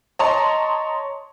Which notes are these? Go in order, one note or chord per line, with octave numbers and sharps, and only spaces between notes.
C#5 D#5 A5 A#5 C6